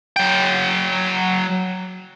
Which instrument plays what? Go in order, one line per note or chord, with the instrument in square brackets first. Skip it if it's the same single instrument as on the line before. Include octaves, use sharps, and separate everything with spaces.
[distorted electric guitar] F#3 G5